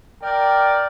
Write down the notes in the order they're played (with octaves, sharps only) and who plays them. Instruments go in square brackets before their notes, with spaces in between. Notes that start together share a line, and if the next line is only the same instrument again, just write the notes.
[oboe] A#4 [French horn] D5 [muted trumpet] G5